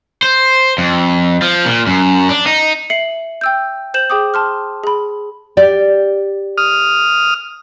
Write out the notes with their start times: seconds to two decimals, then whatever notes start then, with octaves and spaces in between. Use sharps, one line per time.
0.23 C5
0.78 F2
1.42 F3
1.66 A#2
1.87 F#2
2.29 D4
2.47 D#4
2.90 E5 C7 C#7 F#7
3.41 G5 E6 G6
3.94 C5 G6 E7 F#7
4.10 G#4 G5 D6 D#6
4.34 A5 C6 F6
4.84 G#4 B5
5.57 G4 D5
6.58 D#6 F6